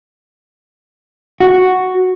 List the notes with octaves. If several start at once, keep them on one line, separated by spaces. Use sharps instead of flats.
F#4